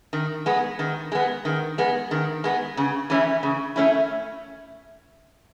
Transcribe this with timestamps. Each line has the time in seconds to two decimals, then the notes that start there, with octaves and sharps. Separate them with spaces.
0.13 D#3
0.46 G#3 B3
0.79 D#3
1.12 G#3 B3
1.45 D#3
1.78 G#3 B3
2.11 D#3
2.44 G#3 B3
2.77 C#3
3.10 E3 A3 C#4 E4
3.43 C#3
3.76 A3 C#4 E4